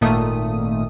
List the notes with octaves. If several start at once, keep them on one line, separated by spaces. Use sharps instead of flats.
G#1 A#2 D#3 A3 D#6